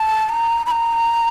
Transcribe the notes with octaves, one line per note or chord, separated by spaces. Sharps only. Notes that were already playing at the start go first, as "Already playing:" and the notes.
Already playing: A5
A#5
B5
A#5